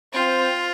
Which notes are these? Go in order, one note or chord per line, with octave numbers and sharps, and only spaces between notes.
C4 F4 C5